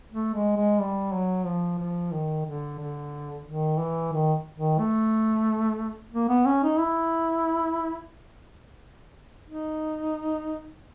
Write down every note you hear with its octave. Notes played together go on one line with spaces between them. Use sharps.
A3
G#3
G#3
G3
F#3
F3
F3
D#3
D3
D3
D#3
E3
D#3
D#3
A3
A#3
B3
C#4
D#4
E4
D#4